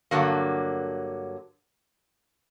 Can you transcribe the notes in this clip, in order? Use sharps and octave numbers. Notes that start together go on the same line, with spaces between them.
G2 D3 F#3 A#3